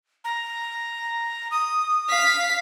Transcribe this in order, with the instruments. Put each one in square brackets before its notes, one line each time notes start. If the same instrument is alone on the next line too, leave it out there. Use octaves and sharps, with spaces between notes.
[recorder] A#5
D#6
[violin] F5 B6